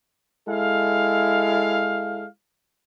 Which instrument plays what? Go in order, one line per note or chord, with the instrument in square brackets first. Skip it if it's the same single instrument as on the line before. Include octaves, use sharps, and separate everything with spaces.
[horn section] G#3 E4 A4 F5